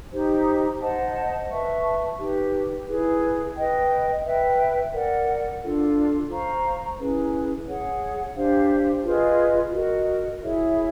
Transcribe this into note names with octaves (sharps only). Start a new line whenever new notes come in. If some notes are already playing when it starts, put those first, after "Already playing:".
D#4 G4 C5
C5 D#5 F#5 A5
B4 E5 A5 C#6
D#4 G4 B4
E4 G#4 B4
B4 D#5 G5
B4 E5 G5
A#4 D5 F#5
D4 F4 A4
C5 F5 A#5 C#6
C#4 E4 G#4 B4
G#4 C#5 F#5
D4 G4 C5 F5
F4 G#4 B4 D#5
F#4 A#4 D#5
E4 G#4 C#5 E5